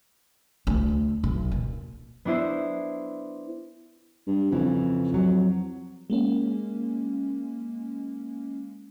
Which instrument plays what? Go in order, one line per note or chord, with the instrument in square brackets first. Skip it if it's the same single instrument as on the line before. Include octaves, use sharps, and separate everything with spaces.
[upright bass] D2
B1
A#2
[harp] B3 D4 E4 C5
[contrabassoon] G2
[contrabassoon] F2 [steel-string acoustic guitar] C#3 E3
[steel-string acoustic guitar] F#3
[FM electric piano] G#3 A#3 C#4